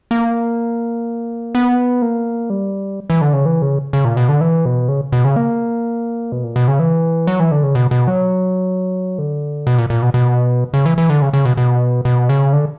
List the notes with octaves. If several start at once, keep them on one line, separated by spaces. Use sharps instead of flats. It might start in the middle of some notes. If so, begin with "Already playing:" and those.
A#3
B3
A#3
G3
E3
D3
C#3
E3
C#3
C#3
A#2
B2
D3
E3
B2
C#3
B2
C#3
A#3
B2
A#2
B2
C#3
E3
F#3
E3
D3
C#3
B2
B2
F#3
D3
B2
A#2
A#2
B2
B2
C#3
E3
E3
D3
C#3
C#3
B2
B2
B2
C#3
D3